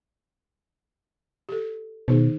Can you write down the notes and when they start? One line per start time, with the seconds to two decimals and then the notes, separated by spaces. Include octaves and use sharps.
1.49 G4 A4
2.08 B2 D#3 D#4 G#4